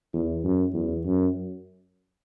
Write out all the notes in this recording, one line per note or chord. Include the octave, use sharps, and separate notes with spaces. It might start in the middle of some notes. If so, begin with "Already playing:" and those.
E2
F#2
E2
F#2